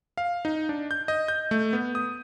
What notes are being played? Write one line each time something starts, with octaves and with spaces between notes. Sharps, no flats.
F5
D#4
D4
G6
D#5
G6
A3
B3
D#6